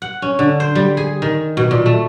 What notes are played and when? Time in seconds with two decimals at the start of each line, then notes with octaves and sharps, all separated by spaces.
0.02 F#5
0.22 C#4
0.39 D3
0.60 C5
0.75 G3
0.97 G#4
1.22 D#3
1.57 B2
1.71 A#2
1.86 A3